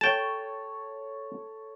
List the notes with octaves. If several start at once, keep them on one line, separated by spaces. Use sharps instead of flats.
A4 C#5 G5 A5